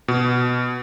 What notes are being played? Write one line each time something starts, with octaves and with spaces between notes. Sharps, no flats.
B2